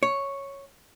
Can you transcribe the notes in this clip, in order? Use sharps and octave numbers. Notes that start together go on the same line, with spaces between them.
C#5